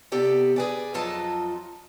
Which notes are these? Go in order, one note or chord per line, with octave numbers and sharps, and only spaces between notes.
C3 B3 G4 A4 D5 G5
G#4 B4 D5
F2 F#3 F4 A4 D#5 A5